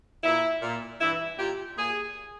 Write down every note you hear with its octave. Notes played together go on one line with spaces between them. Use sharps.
A#2 E4
A#2
G2 E3 E4
A#2 G4
A#2 G#4